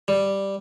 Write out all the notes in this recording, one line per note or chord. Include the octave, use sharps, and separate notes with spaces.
G3